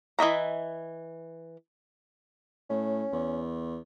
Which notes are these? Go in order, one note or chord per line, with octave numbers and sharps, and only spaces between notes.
E3 D#5 E5 A#5
A2 C#4
E2